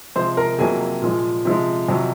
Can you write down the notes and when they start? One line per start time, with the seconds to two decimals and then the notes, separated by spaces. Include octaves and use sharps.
0.15 C3 F3 G#3 C5 C6
0.37 A#4 A#5
0.59 F2 C3 F#3 A#3 G#4 G#5
1.02 A#2 F3 G#3
1.45 C3 F3 G#3
1.89 F2 C3 F#3